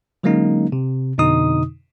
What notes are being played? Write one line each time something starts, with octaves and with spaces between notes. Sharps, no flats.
D3 F#3 G#3 A#3 C#4 D#4
C3
F2 B2 D3 D#4 D#6